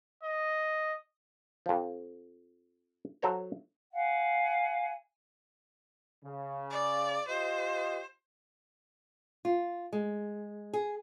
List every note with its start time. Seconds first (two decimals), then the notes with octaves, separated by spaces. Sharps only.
0.23 D#5
1.66 F2 F3
3.22 F#3 A4 C5 C#5 A#5
3.94 F5 F#5 G#5
6.24 C#3
6.70 D5
7.28 F4 G4 C5 D#5
9.45 F4
9.93 G#3
10.73 G#4